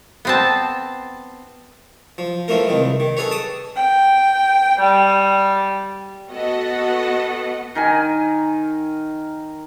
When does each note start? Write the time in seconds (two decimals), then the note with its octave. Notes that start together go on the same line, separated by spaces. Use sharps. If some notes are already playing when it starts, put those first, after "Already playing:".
0.25 B3 C4 A5
2.18 F3
2.48 E3 F3 A3 A#3 A#4
2.67 C2 D#3 G#3
3.00 D#3
3.17 G#4 A4 B4 C#5
3.31 A5 D6 D#6
3.76 G5
4.80 G3
6.30 B3 F#4 A4 D#5 F#5
7.75 D#3 A#4 G#5